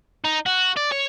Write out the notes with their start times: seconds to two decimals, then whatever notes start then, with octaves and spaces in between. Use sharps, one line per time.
0.24 D#4
0.46 F#4
0.77 D5
0.92 C#5